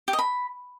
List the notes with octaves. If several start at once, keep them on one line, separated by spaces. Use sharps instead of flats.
G4
D#5
B5